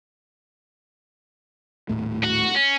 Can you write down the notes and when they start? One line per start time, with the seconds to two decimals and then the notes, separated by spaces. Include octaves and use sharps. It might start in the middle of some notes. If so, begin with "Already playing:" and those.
1.89 D#1 A2 A3
2.24 F#4
2.56 C#4